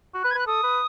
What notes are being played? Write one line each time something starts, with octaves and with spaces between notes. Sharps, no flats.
F#4
B4 F#6
G#6
B4 F#6
A4 D#6
B4